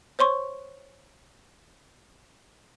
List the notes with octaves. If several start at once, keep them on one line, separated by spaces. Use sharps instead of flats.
C5 C#5 C6 C#6